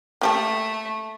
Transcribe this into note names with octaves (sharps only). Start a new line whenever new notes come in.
A3 A#3 G4 A4